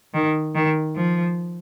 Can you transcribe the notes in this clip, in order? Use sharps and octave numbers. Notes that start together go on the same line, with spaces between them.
D#3
D#3
F3